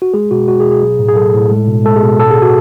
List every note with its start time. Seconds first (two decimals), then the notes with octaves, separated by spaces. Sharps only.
0.02 F#4
0.14 G#3 G#4
0.31 B2 F#4
0.48 G#3 F#4
0.60 G#4
0.66 B2
0.71 G#4
0.83 F#3 G#4
0.99 A2
1.08 G#4
1.16 F#3 A4
1.34 A2
1.51 G#3
1.68 B2
1.85 G#3 A4
1.96 G#4
2.02 B2
2.20 A2 A4
2.31 G#4
2.36 A2
2.42 F#4